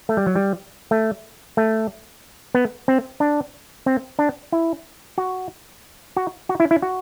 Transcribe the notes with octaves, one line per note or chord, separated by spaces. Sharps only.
A3
G3
F#3
G3
A3
A3
B3
C4
D4
C4
D4
E4
F#4
F#4
F#4
E4
E4
F#4